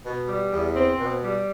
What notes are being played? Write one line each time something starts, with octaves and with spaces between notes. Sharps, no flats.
B2
G3
E2
C4
B2
G3